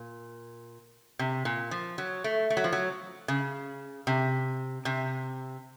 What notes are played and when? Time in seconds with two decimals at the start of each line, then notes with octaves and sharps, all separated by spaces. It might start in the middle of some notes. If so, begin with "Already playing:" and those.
Already playing: A#2
1.19 C3
1.45 A#2
1.71 F3
1.98 F#3
2.24 A3
2.50 A3
2.57 F#3
2.64 F3
2.72 F#3
3.28 C#3
4.07 C3
4.85 C3